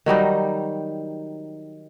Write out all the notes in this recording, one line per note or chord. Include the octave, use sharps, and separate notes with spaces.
D#3 F#3 G3 D#4